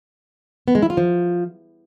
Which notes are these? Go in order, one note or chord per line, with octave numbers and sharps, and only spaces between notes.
B3
G#3
E4
F4
F3